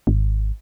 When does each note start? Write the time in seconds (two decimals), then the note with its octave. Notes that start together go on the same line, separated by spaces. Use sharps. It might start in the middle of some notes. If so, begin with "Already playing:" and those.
0.07 G#1